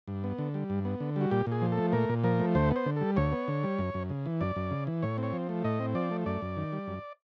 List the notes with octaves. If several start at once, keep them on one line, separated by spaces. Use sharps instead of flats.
G2
B3
D3
G3
G2
B3
D3
G3 F#4
A#2 G4
A#2
G#4
F3
A4
A3
A#2 A#4
A#2
F3 A#4
A3
D2 C5
B3 C5
D3
G3 A4
D2 C#5
B3
D3
G3
F#2
F#2
C#3
E3
F#2 D5
F#2
C#3
E3
A2 C#5
C4
C#5
F3
A3
A2 D#5
C4
F3 D5
A3
F#2 D5
F#2
D#3
G3
F#2